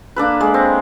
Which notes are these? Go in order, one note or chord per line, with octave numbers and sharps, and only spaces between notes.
A#3 D4 A4 B4
G#3
C4